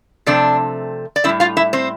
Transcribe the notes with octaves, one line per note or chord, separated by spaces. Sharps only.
C3 F3 A3 C4 D4 D5
D5
A2 G3 C4 E4 E5
F4 F5
E4 E5
C4 C5